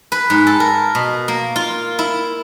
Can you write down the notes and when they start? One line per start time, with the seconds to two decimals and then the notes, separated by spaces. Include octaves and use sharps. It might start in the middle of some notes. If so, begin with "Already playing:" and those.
0.12 B4
0.30 G#2
0.47 A4
0.60 A#4
0.95 B2
1.28 A#3
1.56 F4
1.99 E4